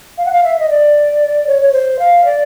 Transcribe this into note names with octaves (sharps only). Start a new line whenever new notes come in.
F5
F#5
F5
E5
D#5
D5
C#5
C#5
C5
F5
D5